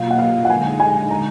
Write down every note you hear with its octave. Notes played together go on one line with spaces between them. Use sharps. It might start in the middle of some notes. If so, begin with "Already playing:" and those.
Already playing: B2 F#3 A#3 F4 F5
F#5
F5
F#5
D3 G#3 D#4 G#5
G#5
A#5